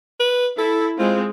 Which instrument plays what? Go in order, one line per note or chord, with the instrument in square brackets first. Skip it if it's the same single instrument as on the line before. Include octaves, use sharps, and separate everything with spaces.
[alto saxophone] B4
[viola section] E4 [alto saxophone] A4
[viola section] G#3 C4 [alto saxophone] F4